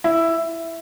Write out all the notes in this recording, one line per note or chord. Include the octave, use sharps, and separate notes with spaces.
E4